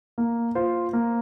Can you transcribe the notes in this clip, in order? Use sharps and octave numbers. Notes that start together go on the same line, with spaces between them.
A#3
F4 C5
A#3